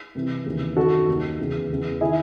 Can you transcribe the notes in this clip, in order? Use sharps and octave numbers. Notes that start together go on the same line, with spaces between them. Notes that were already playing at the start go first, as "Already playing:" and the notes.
C2 C3 E3
D#2 C#3 E3
F#2 D#3 F#4 A4
D#2 D#3
E2 C#3 E3
E2 C#3 E3
D#3 E4 G#4